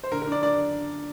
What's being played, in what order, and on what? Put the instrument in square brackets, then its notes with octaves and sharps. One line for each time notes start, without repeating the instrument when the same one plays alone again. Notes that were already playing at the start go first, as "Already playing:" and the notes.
[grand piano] C5
D3 A#4
A#4
D4 D5
D4 D5